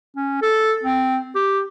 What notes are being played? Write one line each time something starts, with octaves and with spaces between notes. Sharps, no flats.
C#4
A4
C4
G4